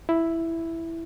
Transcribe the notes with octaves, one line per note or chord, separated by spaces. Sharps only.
E4